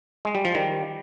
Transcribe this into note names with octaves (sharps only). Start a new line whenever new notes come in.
G#3
G3
F3
D#3 G3